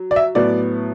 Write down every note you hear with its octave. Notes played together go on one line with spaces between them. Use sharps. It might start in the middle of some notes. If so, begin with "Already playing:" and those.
Already playing: F#3
D5
E5
A2 F#3 B3 D5